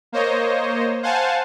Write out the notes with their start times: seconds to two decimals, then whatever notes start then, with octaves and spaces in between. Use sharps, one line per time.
0.12 A#3 C5 C#5 D#5
1.03 C5 F5 F#5 G#5 A5